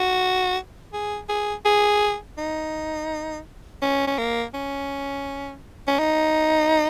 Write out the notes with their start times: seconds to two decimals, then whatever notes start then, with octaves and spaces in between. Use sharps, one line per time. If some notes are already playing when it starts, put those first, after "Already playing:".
Already playing: F#4
0.93 G#4
1.29 G#4
1.65 G#4
2.38 D#4
3.82 C#4
4.07 C#4
4.18 A#3
4.54 C#4
5.87 C#4
5.99 D#4